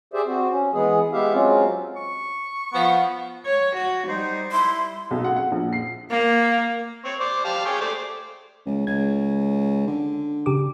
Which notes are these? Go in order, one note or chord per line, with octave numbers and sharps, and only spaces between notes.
G4 G#4 C5 D5 E5
C4 F#4
C#4
E3 G#3 B3 G#4
G#3 B3 G4 E5 F5
F#3 G#3 C4 C#4 F4
C#6
F3 B3 F#5
C#5
F#4
G3 D#4 C5
E4 C6
B1
F#5
F#5
A#1
C7
A#3
C4 C#5
C5 D5
G4 F5 A5
G#4 C#5 G5
A3 C5 D5
C#2
C#2 G#6
D3
C#3 G4 D6